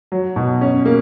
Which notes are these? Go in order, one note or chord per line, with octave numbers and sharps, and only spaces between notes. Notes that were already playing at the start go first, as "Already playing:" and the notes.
F#3
B2
C#4
A#3